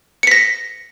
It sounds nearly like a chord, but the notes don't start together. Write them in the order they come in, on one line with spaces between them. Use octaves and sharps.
C#7 B6 A#6